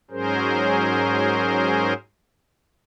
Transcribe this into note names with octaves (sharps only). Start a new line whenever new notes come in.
G#2 F#3 C#4 G#4 A#4 C5